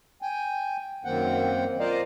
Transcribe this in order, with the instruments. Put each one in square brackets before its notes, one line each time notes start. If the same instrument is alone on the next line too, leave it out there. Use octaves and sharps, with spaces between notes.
[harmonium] G5 G#5
F#2 D#3 A#3 C4 F#5 G5
F4 A#4 C5 D5 D#5 F5